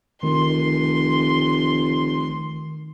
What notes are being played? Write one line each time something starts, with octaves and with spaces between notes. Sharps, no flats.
F1 D#3 C6